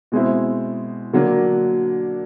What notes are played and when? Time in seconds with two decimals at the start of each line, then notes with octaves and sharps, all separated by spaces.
0.12 B2 G#3 C4 E4
1.13 D3 F#3 A#3 D4